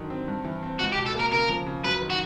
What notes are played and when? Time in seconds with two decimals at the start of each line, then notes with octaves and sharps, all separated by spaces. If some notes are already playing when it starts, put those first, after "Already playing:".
Already playing: F#2 D3 D#3
0.10 C4
0.28 G2
0.44 E3
0.63 C4
0.79 C#2 F#4
0.92 G4
0.97 B2
1.06 A4
1.14 A#3 A#4
1.32 C#3 A#4
1.49 F3
1.66 C#3
1.84 F#2 B4
2.01 D#3
2.10 F#4